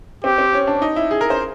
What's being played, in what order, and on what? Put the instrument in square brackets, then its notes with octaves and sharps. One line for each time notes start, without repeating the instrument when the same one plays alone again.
[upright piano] C4 [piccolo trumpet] G4
[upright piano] C4
C#4
D4
D#4
E4
G#4
A#4
C5